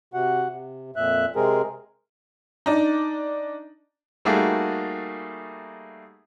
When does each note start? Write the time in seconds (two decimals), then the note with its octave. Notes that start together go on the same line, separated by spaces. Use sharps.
0.14 C3 F#4 F#5
0.49 C3
0.96 F2 A#2 E5 F#6
1.36 C3 G#3 C4 G#4 A#4
2.66 D4 D#4
4.25 G3 A3 A#3 D#4 F#4 G#4